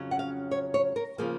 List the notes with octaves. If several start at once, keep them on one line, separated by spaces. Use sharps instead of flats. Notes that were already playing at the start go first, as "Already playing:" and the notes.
Already playing: F2 C#3 F#3 C#4
F#5
F5
C#5
C#5
A#4
C#3 F3 A#3 G#4